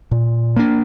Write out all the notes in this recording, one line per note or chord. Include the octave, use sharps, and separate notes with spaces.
A#2
A#3 D4